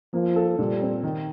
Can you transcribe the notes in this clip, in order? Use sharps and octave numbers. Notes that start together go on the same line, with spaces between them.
F3 A#3
A4
A#2 G3
C4
D#3